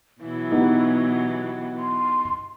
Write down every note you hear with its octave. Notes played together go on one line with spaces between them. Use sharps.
B2 E3 F#3 E4
B3 D#4 G4
C6